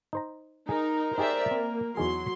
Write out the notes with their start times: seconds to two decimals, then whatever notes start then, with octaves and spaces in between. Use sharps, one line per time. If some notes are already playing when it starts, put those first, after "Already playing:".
0.13 D#4 C5 A#5
0.69 D#4 G#4 A#4
1.18 D#4 G4 G#4 C5 D5 E5
1.51 A#3 C4
1.97 E2 F#3 D#4 G#4 C6